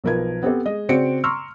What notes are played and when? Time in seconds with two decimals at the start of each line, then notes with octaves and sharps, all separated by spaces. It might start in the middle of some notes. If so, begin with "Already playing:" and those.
0.04 B1 F3 A#4 B4 G#6
0.43 B3 C4 G4 A4 C5
0.65 G#3 D#5
0.89 C#3 C4 F#4 D5 C#7 D7
1.24 A#5 C6 C#6 E6 F6